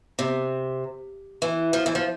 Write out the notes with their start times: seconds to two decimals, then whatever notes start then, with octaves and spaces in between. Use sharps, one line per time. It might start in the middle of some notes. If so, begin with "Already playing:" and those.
0.19 C3
1.42 E3
1.73 F3
1.86 E3
1.95 F3